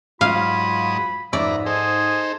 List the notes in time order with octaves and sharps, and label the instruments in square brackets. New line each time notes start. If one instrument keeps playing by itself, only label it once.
[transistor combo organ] G#2 F#3 D#6 [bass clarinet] F4 [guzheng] F5 [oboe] B5
[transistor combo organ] F2 B4 A#5 [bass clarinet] G#2 [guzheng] D5 [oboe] E5
[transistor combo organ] D#4 A4 C5 [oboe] G#4